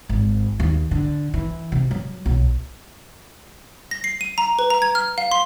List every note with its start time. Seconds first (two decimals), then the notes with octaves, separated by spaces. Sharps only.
0.09 G#1
0.60 D#2
0.91 D3
1.34 E3
1.72 C3
1.91 F#3
2.26 B1
3.91 A#6
4.04 C7
4.21 D#7
4.38 A#5
4.59 B4
4.70 A#5
4.82 G#6
4.95 F6
5.18 F5
5.31 C6